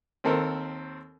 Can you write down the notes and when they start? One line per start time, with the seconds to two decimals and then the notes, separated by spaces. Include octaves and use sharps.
0.24 D#2 C4 A4 A#4 C5